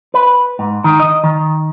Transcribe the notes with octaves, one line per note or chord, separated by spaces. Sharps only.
B4
G#2
D#3
D#5
D#3